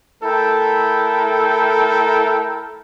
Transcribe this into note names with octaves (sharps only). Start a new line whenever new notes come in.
A3 E4 A4 A#4 G5 A#5